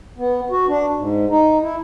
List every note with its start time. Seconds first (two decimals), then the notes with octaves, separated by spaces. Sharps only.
0.18 B3
0.51 F#4
0.68 D4
0.97 G#2
1.30 D#4
1.62 E4